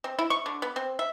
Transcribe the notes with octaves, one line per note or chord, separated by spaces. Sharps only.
C4
E4
C#6
D3
B3
C4
E5